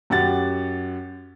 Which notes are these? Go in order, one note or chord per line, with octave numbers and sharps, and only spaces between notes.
F#2 G4 F#5 A6